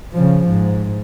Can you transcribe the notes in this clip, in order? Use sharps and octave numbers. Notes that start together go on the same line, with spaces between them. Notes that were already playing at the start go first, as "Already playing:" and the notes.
C#3 F3
G#2